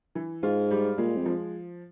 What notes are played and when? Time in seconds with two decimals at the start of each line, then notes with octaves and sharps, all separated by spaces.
0.15 E3
0.43 G#2 F4
0.71 G3
0.98 A#2 G#3
1.17 F2
1.26 F3